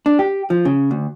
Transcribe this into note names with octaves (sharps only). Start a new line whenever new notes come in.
D4
G4
F3
C#3
D2